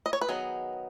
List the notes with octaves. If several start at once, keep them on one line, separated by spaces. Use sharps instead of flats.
D#5
C#5
B4
D#3 F#3 B3 D#4 G#4